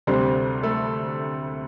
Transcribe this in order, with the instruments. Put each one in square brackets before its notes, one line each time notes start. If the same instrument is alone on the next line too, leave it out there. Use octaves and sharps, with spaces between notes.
[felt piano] D2 C3 G3 C4 D4 C5
A3 A4